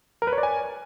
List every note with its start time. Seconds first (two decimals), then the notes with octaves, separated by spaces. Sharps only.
0.22 A#4
0.27 B4
0.33 C#5
0.38 D5
0.43 G#5